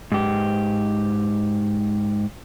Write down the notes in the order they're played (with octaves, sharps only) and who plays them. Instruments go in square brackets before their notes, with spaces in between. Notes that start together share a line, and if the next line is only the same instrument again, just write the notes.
[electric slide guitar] G#2 G4